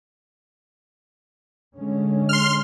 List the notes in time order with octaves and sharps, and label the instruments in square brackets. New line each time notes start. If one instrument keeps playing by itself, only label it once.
[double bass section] D3 G#3 C#4
[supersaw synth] C6 F6